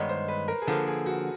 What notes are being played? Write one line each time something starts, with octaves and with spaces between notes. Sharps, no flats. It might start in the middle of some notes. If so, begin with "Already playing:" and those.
Already playing: G2 D#3 G#3 B3 C#5
C5
B4
A#4
G#4
D3 F3 A#3 A4
G#4
F#4